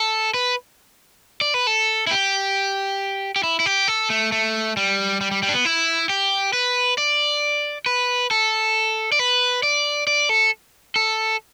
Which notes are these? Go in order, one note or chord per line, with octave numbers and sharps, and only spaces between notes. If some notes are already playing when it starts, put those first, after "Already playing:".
Already playing: A4
B4
D5
B4
A4
E4
G4
G4
E4
E4
G4
A4
A3
A3
G3
G3
G3
G3
D4
B3
E4
G4
B4
D5
B4
A4
D5
B4
D5
D5
A4
A4